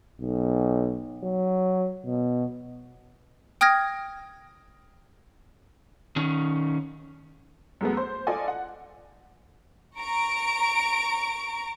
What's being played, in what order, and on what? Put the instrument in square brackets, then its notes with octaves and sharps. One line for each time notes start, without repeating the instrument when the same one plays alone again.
[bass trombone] B1
F#3
B2
[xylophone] G5 D#6 F6 G#6 A#6
[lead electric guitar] D#3 C#4
[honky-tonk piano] F#2 G#3 A3 B3
C5
F4 A4 D5 D#5 G#5
F#5
[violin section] A#5 C#6 D7